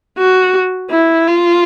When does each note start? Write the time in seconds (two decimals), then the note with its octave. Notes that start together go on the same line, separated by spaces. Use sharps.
0.18 F#4
0.90 E4
1.27 F4